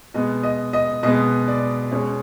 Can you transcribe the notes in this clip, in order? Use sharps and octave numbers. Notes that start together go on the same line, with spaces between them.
B2 G#3 B3 D#5
D#5
D#5
B2 G#3 B3 D#5
D5
B2 G#3 C#4 C#5